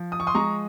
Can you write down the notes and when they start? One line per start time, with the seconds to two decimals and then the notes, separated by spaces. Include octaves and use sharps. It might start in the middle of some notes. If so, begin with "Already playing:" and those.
Already playing: F3
0.12 D#6
0.20 C#6
0.27 C6 D#6
0.35 G#3 A#5 C#6